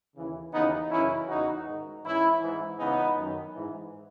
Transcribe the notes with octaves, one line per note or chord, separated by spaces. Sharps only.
D#2 C#3 E3
D#2 C#3 E3 B3 D#4
F#2 C#3 E3 C#4 E4
E2 C#3 E3 D#4 F#4
G#2 D#3
G#2 E3 C#4 E4
G#2 E3
C#2 C#3 E3 B3 D#4
F#2 D#3
G#2 E3